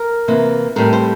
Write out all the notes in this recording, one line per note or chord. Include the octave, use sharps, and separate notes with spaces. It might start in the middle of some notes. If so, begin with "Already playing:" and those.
Already playing: A#4
C3 E3 A#3
A2 G3 C4 A#4
C5